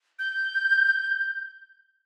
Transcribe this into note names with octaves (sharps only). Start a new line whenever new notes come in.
G6